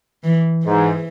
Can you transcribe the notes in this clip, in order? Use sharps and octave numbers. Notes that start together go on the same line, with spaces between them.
E3
G#2 E3